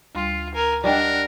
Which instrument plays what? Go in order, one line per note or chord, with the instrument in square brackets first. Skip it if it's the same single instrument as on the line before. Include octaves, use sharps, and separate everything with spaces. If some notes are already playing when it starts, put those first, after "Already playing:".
[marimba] D2 G3 C6 [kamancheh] F4
[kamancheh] A#4 G#5
[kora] G3 [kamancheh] D4 F#5 [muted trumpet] A#4 [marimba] D5 D#5 G5